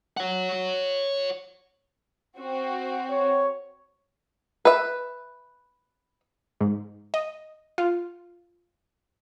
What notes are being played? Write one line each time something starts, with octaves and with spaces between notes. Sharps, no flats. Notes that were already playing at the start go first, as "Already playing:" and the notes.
C#5 F#5
C4 F#4
C#5
B4 E5
G#2
D#5
F4